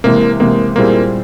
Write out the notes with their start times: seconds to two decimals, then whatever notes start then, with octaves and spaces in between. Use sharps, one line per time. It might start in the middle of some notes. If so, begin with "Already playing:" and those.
0.04 C3 E3 G#3 A#3
0.40 C3 E3 G#3 A#3
0.75 A#2 G3 A#3 C4 E4 G#4